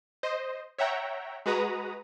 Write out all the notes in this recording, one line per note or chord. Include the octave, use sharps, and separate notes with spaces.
C5 D#5
C#5 E5 F#5 G5 A#5
G#3 F#4 B4 A#5 D#6